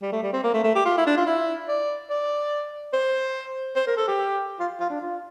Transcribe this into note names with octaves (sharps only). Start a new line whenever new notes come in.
G3
A3
G3
C4
A#3
A3
A3
G4
F4
E4
D4
F4
E4
D5
D5
C5
C5
A#4
A4
G4
F4
F4
D4
F4